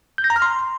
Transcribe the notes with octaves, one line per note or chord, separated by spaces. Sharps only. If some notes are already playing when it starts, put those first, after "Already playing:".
G6
A#6
A#5
F6
C6